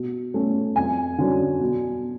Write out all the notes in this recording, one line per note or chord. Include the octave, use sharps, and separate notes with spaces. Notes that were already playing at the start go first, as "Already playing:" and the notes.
Already playing: B2
A3 C#4
F2 G#5
D3 F#3 C#4
B2